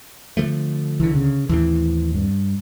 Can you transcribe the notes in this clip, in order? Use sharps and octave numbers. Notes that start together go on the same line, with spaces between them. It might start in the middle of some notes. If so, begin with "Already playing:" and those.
D3 F3 A3
C#2 D3 E3
C#3
D#2 A2 E3 C4
G2